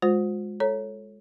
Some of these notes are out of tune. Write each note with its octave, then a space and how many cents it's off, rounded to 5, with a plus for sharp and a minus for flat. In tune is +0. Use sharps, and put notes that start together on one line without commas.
G#3 +0 F4 +40 C5 +0
A4 +0 C#5 -10 A#5 +0